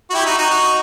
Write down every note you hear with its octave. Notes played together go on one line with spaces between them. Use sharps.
F#4
E4 G4
D#4 F#4
D#4 F#4
D#4 F#4